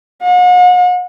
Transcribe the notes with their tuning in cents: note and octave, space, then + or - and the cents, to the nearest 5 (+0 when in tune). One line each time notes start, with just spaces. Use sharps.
F#5 -40